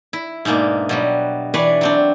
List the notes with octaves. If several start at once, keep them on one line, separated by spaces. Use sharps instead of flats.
E4
G#2 B2 G#3 A#3 D4
B2 F#3 G3
E3 D4 B4 C#5 D5
F#3 C4 D4